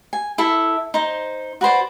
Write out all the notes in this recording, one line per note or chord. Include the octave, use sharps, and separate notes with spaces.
G#5
E4 A4 E5
D#4 C5
F#4 B4 C5 D5